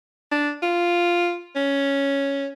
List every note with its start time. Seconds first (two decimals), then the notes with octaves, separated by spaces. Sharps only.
0.31 D4
0.62 F4
1.55 C#4